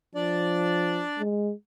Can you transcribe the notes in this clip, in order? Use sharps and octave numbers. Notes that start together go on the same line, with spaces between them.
F3 D4 D5
G#3